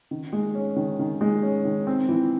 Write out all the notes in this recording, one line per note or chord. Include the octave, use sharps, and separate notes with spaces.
D#3
G#3
C#4
D#3
D#3
G#3
C#4
D#3
C4
E3